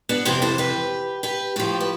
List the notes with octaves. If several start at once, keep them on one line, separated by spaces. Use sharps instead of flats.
B3 D4
F2 C3 E3 C4 E4
A4 C5
G4 B4
G4 B4
A2 F3 G4 B4
B4